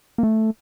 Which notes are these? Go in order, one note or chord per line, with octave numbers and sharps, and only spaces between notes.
A#3
A3